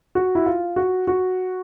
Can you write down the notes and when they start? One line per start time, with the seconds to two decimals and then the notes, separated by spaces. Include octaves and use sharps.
0.15 F#4
0.35 E4
0.46 F4
0.76 F#4
1.07 F#4